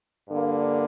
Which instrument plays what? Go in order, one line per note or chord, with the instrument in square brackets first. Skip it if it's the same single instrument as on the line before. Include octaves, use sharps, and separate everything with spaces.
[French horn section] G2 D3 A#3